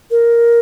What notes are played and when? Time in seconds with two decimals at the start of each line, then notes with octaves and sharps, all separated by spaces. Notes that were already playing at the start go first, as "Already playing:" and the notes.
0.11 A#4